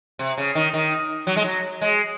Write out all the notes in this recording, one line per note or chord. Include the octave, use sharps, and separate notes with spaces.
C3
C#3
D#3
D#3
F#3
G#3
F#3
G#3